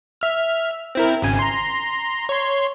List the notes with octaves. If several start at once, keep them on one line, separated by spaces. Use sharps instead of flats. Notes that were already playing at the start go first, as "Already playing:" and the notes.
E5 F6
C4 E4 A#4
G#1 C#3 G#5
A#5 C6
C#5 C6